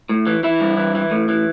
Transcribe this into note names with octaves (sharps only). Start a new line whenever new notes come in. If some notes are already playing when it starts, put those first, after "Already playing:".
A2
E3
E3 E4
G2
E3
E3
A2
E3